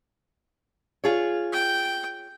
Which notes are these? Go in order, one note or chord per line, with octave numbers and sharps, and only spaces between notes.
F4 G#4 C#5
G5